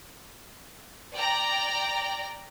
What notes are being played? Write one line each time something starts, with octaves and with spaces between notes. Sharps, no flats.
D5 G5 A#5